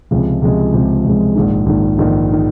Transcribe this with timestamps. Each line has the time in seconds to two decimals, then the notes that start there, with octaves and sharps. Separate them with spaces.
0.11 C#2 C3 F3 G#3
0.42 C#2 C3 F3 G#3
0.74 C#2 C3 F3 G#3
1.04 C#2 C3 F3 G#3
1.35 A#1 G#2 D#3
1.66 A#1 G#2 D#3
1.98 A#1 G#2 D#3
2.32 D#3